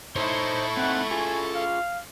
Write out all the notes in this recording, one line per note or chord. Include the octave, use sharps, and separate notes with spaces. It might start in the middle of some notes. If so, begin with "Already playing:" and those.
D#4 E4 A4 C5 C#5 C#6
C4 D#4 F#5
F4 G#4 G#5
F5